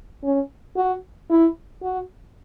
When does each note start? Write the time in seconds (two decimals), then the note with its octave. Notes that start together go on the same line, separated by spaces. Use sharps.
0.24 C#4
0.77 F#4
1.30 E4
1.83 F#4